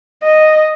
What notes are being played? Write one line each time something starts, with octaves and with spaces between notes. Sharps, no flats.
D#5